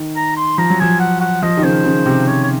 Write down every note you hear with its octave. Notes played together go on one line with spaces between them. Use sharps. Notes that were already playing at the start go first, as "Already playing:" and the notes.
Already playing: D#3
A#5
C6
F3 A#5
F#3
F3 G#5
F#5
F#5
F3 D#5
D#3
C#3 C5
C#3
C3
C#5
C#5